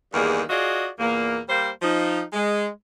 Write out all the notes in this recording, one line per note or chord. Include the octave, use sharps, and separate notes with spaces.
E2 G2 D#3 A#3 G#4
F4 F#4 G#4 D5 D#5
E2 A#2 A#3
G3 A#3 C5
F3 D#4
G#3